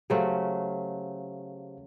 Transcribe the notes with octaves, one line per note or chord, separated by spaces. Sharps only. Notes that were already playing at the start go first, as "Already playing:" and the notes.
C#3 F#3 A3 G4 C5 F5